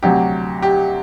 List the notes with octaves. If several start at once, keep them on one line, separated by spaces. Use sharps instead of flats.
D2 C3 F#3 G4
G4